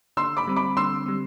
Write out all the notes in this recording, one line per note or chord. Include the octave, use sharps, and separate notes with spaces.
D3 C6 E6
B5 D6
G3 C4
B5 D6
D3 C6 E6
G3 C4